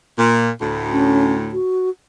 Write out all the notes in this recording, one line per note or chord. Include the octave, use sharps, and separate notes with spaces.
A#2
D2 A2
C#4
F#4